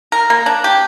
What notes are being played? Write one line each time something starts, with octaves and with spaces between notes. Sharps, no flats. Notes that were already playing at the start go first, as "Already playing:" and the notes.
A#4
A#3
D4
G4